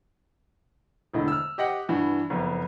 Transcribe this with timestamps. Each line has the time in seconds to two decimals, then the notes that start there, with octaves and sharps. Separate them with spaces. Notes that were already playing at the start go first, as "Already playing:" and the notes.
1.13 E1 A2 D3 D#5
1.28 E6 F6
1.58 G4 D#5 F#5 G5
1.89 G2 E3 F#4
2.30 F#1 F2 B3